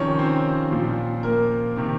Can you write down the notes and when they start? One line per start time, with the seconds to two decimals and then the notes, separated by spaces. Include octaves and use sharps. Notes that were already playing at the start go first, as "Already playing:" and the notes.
Already playing: C3 D#3 F3 C#4 F4 C#5
0.18 C4 C5
0.70 A#2 F3
1.23 A#3 A#4
1.77 C3 D#3